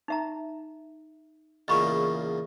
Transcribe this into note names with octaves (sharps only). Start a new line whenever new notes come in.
D#4 E5 A#5
E2 A#2 C#3 D#5 B5 C#6